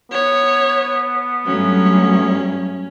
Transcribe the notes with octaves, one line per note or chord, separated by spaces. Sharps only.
B3 C#5
G2 F#3 A3 C#4